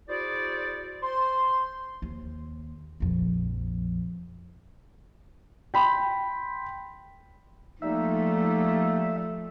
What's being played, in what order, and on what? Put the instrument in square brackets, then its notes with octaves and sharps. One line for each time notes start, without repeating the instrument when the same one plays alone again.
[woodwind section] E4 F#4 G#4 C5 D5
C5 C6
[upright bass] D#2
A#1 F2
[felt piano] G5 B5 C6
[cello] F3 A3 [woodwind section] G3 A#3 D#4 [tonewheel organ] E5